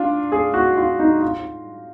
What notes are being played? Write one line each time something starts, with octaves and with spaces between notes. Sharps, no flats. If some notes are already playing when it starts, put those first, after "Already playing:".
Already playing: D4 F4
G#4
F#4
F4
D#4
F4